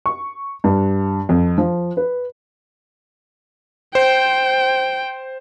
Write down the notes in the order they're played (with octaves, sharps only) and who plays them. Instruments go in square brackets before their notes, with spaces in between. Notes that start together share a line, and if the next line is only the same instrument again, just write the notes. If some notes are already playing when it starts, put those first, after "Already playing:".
[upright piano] C#6
G2
F2
F3
B4
[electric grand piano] C5 [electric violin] G5